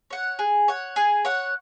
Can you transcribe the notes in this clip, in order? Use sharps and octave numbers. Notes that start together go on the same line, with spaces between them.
C#5 F#5
G#4
C#5 F#5
G#4
C#5 F#5